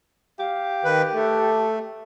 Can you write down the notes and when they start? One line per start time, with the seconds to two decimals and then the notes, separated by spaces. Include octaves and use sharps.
0.39 G4 F5
0.84 D#3 B4
1.14 A3 A4